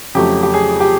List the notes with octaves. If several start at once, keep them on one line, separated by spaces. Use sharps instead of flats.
F2 C#3 F#3 A3 G4
G4
G#4
G4